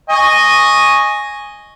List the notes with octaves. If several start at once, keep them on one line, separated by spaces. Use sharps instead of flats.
D#5 G#5 C#6